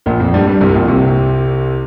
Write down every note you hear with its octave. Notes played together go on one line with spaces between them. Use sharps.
A#1 A#2
F2 F3
G2 G3
G2 G3
C2 C3
A#1 A#2
C2 C3